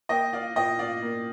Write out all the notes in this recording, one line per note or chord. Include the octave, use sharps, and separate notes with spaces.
A#3 D#5 G5
D5 F5
A#2 D#5 G5
D5 F5
A#3